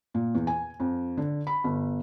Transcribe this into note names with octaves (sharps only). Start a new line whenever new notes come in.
A#2
E2
G#5
F2
D3
B5
G1